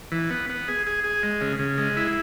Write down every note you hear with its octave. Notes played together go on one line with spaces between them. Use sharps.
E3
B3
B3
G#4
G#4
G#4
G#3
C#3
C#3
G#3
E4